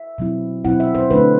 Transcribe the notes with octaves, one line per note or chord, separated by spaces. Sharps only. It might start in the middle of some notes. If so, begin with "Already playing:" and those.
Already playing: E5
B2 F#3 C4 E4
B2 F#3 C4 E4 F#5
E5
C5
D3 A3 D4 B4